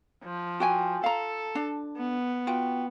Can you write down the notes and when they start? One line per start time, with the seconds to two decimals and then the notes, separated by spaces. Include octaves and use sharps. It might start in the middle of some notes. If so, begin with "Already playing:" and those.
0.24 F3
0.60 F#4 G5 G#5
1.04 A4 F5 A#5
1.55 D4
1.98 B3
2.47 F4 F#4 G5